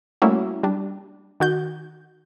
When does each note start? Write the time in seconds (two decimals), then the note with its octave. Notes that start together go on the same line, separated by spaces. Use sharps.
0.22 G3 A3 A#3 C#4 E4 F#4
0.63 G3 D4
1.40 D#3 F#4 G6